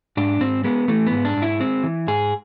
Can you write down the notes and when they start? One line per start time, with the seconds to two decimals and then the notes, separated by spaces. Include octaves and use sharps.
0.17 G#2 D4
0.41 G#2 C4
0.64 G#3 B3
0.88 E3 A3
1.07 B3
1.12 G#2
1.25 D4
1.37 G#2
1.42 E4
1.60 G#3 C4
1.83 E3
2.07 G#2 G#4